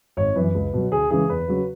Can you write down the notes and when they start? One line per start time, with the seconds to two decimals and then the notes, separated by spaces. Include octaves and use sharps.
0.17 G#1 C#5
0.36 F#2 E3 B4
0.54 C#2
0.73 B2 F#3
0.92 D2 G#4
1.10 C#3 E3 G#3 G#4
1.29 E2 B4
1.48 C#3 F#3